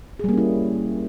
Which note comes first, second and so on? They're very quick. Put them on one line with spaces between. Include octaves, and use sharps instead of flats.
G#4 G3 A#3 C#4 E4